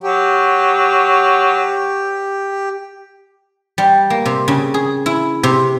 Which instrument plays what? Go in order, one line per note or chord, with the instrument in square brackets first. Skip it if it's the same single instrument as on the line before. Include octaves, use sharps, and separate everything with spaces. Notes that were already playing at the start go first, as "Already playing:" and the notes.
[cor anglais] F#3 [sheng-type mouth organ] G4
[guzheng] G3
A#3
C3
C#3
G#4
E4
C3